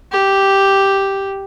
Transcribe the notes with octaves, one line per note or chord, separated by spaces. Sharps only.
G4